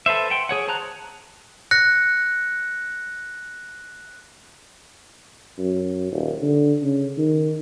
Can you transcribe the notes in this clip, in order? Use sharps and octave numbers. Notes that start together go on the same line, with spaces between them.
A4 B4 C5 E5
F#5 G5 C6
G#4 C#5 F#5
C5 A5 A#5 F#6
F#6 A#6 C#7
F#2
D#1
D3
C#3
D#3